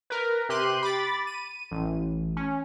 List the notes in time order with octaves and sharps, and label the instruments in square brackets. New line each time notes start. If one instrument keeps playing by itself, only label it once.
[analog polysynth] A#4 B4
C3 G4 C6 F#6 D#7
B5 D6 A6
D#7
A1
C#4